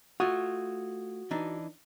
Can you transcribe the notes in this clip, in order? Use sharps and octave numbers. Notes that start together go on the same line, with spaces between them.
A3 F4 F#4 D#6 G#6
E3 D4 D#4